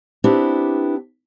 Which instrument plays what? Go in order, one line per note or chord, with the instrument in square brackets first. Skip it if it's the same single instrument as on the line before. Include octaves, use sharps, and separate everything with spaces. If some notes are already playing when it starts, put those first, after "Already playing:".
[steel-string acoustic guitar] B3 C4 D4 E4 G4